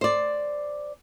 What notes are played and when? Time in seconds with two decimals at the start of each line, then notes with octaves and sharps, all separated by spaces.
0.01 C5 D5